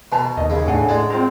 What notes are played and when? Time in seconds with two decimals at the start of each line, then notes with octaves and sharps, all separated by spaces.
0.12 B2 B4 A5 A#5
0.37 D#2 D#5
0.50 C#3
0.68 A2 D4 F#5 G#5
0.89 G#3 D5
1.10 C4 F4 A#5